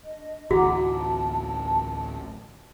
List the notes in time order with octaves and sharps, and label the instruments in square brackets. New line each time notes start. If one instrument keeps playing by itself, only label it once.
[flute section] D4 D#5
[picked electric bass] A1 D2 E3 [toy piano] F#4 [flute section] F#5 A#5 D6
[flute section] A5